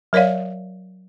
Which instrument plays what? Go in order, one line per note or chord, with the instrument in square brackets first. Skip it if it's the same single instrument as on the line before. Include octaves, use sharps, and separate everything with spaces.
[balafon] F#3 A#4 C#5 D5 F5